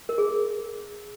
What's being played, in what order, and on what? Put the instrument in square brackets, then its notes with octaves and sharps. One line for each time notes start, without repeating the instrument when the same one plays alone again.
[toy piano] A#4
G#4